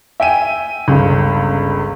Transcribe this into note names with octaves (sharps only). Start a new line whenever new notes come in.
E5 G5 G#5 D#7
G1 C#2